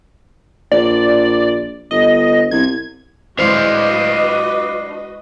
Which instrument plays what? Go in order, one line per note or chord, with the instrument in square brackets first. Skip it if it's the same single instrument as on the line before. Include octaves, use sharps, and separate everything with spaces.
[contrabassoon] A#1 [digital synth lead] D5
[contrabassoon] G1 [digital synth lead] D#5
[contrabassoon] C2 [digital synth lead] G#6
[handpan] G#3 E4 C5 [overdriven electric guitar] D4 F5 [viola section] F#4 B4 D#5